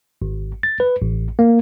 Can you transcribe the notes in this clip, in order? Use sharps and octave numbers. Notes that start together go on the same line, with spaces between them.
G#1
A6
B4
A1
A#3